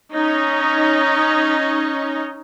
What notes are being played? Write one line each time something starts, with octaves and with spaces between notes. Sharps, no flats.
C#4 D#4 C#5 D#5